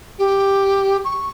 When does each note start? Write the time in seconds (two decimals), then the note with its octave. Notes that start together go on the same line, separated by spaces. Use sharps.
0.19 G4
1.04 C#6